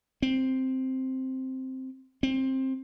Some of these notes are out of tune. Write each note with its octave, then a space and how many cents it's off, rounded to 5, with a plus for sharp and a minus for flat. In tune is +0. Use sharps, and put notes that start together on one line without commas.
C4 +0
C4 +15